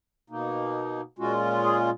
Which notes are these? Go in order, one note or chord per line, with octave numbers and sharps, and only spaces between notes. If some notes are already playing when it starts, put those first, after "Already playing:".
B2 A#3 D#4
A#2 G#3 C#4 F4 F#4
G#4